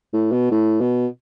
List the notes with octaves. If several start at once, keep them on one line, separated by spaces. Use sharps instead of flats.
A2
B2
A2
B2